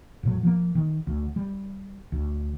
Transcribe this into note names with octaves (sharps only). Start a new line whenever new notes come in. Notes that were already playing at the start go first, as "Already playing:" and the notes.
E1 A2 F#3
F3 G3 A#3
D#3
D2
G3
D2